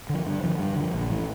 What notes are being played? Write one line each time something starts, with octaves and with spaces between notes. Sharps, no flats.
D3 F3
G2
D3 F3
G2
D3 F3
A#1
A2 E3